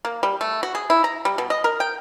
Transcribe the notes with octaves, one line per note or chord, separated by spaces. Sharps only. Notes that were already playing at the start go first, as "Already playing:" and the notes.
A#3
G3
A3
F#4
G#4
E4
A#5
G3
B2
D#5
A#4
G5